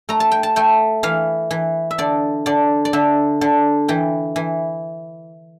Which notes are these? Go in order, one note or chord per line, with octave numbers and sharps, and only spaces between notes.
A3 A#5
A5
G5
A5
A3 G5
E3 F5
E3
E5
D3 D5
D3 D5
D5
D3 E5
D3
E3 G5
E3